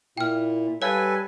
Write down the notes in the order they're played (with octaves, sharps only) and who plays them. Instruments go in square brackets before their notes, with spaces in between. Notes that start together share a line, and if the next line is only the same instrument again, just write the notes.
[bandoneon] A#2 [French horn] E4 [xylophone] G5 F6
[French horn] G3 [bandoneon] A4 B4 G#5 [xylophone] C#5 F5